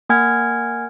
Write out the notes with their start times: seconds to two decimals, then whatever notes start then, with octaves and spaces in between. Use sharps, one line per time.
0.09 A#3 F#5 G#5 F6 G#6